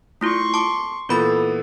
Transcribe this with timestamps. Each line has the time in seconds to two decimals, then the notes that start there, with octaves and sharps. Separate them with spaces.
0.21 A3 E4 F4 C6 C#6
0.54 A5 D6
1.09 A#2 E3 B3 F4 A4 B5 A6